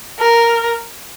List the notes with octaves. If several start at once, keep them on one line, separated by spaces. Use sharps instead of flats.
A#4